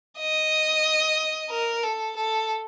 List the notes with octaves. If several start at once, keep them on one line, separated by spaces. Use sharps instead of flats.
D#5
A#4
A4
A4